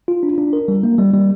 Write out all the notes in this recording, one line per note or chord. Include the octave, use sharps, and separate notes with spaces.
F4
D4
D4
A#4
G3
A#3
G3
G3